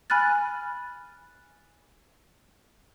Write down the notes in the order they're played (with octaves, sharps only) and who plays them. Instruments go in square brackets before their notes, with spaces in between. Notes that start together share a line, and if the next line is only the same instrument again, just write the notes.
[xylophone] G#5 B5 F6 F#6 A6